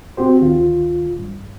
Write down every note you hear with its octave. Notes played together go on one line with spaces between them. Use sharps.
C4 F#4 G4 C5
D2 D#3 F4
G2